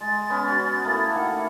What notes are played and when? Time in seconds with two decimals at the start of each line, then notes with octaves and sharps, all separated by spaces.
0.01 G#3 A6
0.30 B3 C#4
0.48 C#4 F#4
0.84 A3 A#3 E4
1.15 D#3 F#5